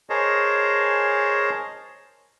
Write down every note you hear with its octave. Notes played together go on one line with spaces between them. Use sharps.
G#4 A#4 C5 C#5 D#5 A5